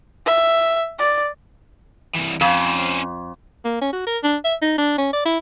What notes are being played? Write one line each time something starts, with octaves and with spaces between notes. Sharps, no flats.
E5
D5
C2 E3
F2 C#4 C5
A#3
C#4
F#4
A#4
D4
E5
D#4
D4
C#4
D5
E4